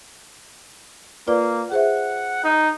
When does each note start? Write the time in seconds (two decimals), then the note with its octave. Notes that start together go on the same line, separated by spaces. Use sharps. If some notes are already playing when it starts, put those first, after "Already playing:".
1.28 A#3 F4 B4 D5
1.72 G#4 C5 E5 F#5
2.44 D#4